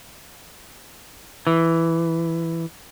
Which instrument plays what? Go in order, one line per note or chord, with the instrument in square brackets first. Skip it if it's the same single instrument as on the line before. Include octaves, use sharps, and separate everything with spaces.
[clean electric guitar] E3